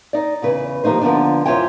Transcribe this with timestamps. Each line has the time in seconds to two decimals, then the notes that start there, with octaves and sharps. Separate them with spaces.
0.13 D#4 D5
0.42 E2 C#3 B4
0.84 D#3 F3 G3 A#3 D#4 C5
1.01 D3 F3 A#3 B3 D4
1.45 F#2 E4 F4 C5 C#5 G5